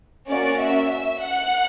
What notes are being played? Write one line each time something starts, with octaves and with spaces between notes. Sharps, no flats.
A#3 C#4 F#4 D5
E5
F#5